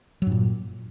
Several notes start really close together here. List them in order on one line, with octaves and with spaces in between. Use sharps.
F#3 G2 A#2